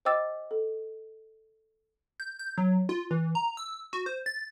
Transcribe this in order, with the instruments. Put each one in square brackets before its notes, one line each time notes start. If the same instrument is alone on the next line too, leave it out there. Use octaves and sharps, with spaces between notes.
[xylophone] C5 D#5 G5 D6 E6 A6
A4
[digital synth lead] G6
G6
F#3
F4
E3
A#5
E6
F#4
C5
A6